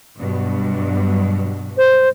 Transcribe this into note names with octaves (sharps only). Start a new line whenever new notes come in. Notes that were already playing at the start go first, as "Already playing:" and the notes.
G2 B2 F#3
C5